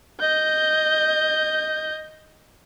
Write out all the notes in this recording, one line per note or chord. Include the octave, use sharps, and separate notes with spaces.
D#5 G6